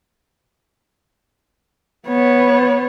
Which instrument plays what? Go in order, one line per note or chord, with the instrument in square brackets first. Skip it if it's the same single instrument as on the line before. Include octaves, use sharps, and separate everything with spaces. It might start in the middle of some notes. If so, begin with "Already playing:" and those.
[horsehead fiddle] B3 C#5